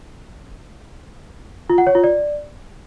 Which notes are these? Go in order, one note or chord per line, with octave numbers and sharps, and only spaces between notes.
F4
F#5
C#5
F4
D5